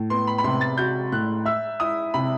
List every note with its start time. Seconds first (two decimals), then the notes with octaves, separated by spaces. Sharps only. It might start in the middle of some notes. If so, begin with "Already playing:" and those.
Already playing: A2
0.10 B3 C6
0.27 B5
0.38 B5
0.44 C3 C6
0.61 A6
0.78 F#4 G6
1.12 A2 F#6
1.45 E5 E6
1.80 E4 D#6
2.14 C3 B5